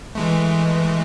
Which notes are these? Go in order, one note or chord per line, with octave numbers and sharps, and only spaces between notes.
E3 G#3 A3